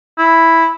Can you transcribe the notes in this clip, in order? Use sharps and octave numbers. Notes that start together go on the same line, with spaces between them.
E4